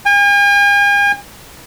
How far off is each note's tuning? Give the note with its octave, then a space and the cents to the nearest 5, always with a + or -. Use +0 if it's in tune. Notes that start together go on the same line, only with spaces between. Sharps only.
G#5 -45